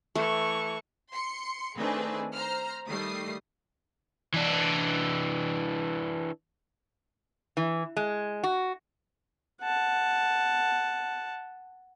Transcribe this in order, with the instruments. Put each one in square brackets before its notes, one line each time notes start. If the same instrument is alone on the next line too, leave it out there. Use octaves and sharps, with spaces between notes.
[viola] E3 C#6 [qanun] A3
[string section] C6 C#7
D#3 A3 C4 D4 G#4 B4
C5 A#5 F6
D#3 G3 A3 D#6 C7
[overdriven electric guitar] E3 D4
[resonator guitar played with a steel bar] E3
G#3
F#4
[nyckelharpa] F#5 A5